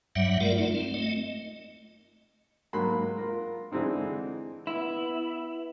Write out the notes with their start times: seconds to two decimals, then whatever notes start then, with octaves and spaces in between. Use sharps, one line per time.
0.16 G2 F#3 G3 E5 F#5
0.41 G#3 A3 F4 A#4 D5
0.58 A3 D#4 F4
0.73 C4
0.94 A3 D#5
2.73 G#2 F#3 A#3 B5 C6
3.17 F4 A#4
3.71 D3 E3 G#3 C4 D#4
4.67 B3 E4